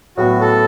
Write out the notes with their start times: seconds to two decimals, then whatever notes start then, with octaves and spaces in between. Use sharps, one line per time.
0.17 A2 F#3 B3 F#4
0.41 A4